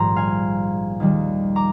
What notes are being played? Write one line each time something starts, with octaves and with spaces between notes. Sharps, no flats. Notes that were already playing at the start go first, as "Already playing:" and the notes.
Already playing: A#1 G#2 D#3 G3 A#5 C6
F5 G#5
D#2 D#3 G3
A#5 D6